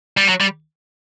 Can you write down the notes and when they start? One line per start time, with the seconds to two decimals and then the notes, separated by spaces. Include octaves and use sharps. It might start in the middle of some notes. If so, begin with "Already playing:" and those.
0.17 G3
0.28 F#3
0.41 G3